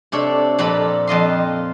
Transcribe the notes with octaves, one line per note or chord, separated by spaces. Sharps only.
C3 D4 A4 C#5
F2 A#2 F4 A4 D5 B5
F2 F4 D#5 C6